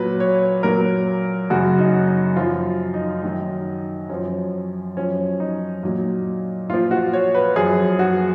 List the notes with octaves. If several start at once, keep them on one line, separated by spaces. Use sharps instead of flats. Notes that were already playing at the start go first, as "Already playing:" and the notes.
Already playing: A#2 F#3 B4
C#5
A#2 F#3 A#4
F#2 C#3 F#3 F#4
D#4
D#4
F#2 F3 F4
D#4
F#2 D#3 F#3
F#2 F3 C#4
F#2 F3 C#4
D#4
A#2 F#3
A#2 F3 F4
F#4
C#5
B4
F#2 F3 G#4
F#4